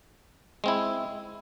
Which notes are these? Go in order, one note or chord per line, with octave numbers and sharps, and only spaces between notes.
G#3 C4 E4